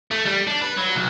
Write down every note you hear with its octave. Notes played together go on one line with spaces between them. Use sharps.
A3
G3
D4
B4
F#3
B1